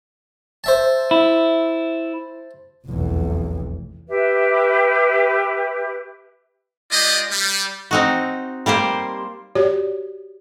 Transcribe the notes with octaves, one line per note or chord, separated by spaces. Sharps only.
C5 E5 A5
E4
F1 B1 E2
G4 B4 E5
G#3 F4 G4 D5 D#5
G3
C4 D#4 F#4
G3 A#3 G4 C5
F#4 G4 C#5 D5